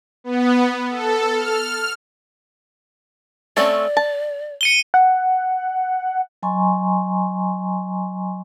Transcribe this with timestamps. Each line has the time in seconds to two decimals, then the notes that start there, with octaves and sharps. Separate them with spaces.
0.24 B3
0.90 A4
1.34 F6
3.57 A3 C4 C#4 D5
3.97 A5
4.61 C#7 D#7 G7
4.94 F#5
6.43 F#3 D#5 G#5 A#5 C6 C#6